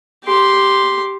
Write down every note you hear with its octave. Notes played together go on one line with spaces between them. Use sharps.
G4 C6